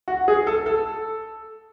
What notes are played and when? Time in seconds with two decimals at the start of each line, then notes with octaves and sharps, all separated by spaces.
0.08 F#4
0.28 G#4
0.47 A4
0.66 A4